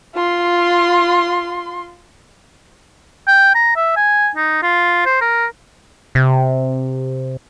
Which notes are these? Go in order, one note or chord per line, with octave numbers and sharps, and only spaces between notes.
F4 C6
G5
A#5
E5
G#5
D#4
F4
C5
A#4
C3